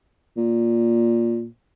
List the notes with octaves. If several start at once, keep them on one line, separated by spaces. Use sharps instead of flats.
A#2